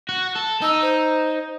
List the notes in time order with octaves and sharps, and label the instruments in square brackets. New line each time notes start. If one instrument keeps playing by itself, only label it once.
[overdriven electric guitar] F#4
A4
[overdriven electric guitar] D#4 [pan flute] E6
[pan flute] C5